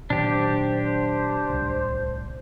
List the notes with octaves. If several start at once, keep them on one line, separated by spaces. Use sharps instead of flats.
A#2 D#3 F#3 D4 G4 C5
D1 C2